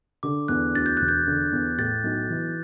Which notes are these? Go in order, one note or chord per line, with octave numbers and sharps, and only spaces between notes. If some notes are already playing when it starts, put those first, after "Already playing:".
D3 D6
E2 F#6
D2 A6
G6
E1 F#6
G6
D3
E2
A2 A6
B1
E3